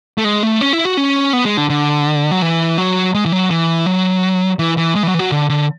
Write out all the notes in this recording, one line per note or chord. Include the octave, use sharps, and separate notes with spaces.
A3
G#3
A3
C#4
E4
F#4
C#4
B3
G#3
D3
D3
F#3
E3
F#3
G#3
E3
F#3
E3
F#3
E3
E3
G#3
E3
F#3
E3
F#3
D3
D3